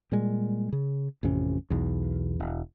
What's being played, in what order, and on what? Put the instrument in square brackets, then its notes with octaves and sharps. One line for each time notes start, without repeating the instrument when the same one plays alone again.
[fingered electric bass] A#2 G3 G#3
C#3
A1 F2 C3 C#4
B1 E2
E1